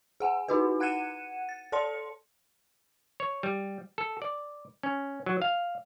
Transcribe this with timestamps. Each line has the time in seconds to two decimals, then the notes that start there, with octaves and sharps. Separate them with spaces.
0.20 G#4 F#5 G#5
0.48 D#4 E4 F#4 G#4 B4
0.80 F#5 F#6 G#6 C#7 D#7 E7
1.49 A6
1.72 A4 D5 A5 C6 C#7
3.20 C#5
3.43 G3
3.98 A4
4.22 D5
4.83 C#4
5.26 F#3
5.42 F5